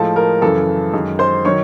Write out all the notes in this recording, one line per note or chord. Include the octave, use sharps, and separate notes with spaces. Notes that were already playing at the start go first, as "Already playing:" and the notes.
Already playing: A2 F3 G#3 A4 A5
A#4 A#5
F#2 C#3 E3 A4 A5
F#2 D#3 G#3
C5 C6
D#3 F#3 C#5 C#6